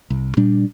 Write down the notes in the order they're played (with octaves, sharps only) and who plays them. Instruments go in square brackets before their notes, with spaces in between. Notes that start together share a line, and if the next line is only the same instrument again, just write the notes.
[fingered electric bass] C2
A#2 G3 D4